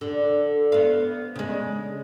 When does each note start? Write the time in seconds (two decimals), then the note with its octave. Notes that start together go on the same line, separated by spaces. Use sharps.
0.01 D3
0.72 B3 F5
1.35 C#3 G#3